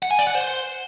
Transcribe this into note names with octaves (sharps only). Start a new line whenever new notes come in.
F#5
G#5
D5
F#5
C5